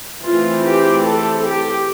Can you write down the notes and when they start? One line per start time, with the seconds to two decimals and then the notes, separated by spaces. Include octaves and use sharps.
0.24 E3 A3 C4 F4
0.65 G4
1.05 A4
1.45 G4